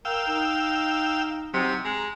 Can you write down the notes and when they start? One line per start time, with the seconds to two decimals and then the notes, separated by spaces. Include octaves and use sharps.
0.05 A#4 F5 G5 E6
0.28 D#4
1.54 C3 F#3 D#4
1.85 G#3 A#5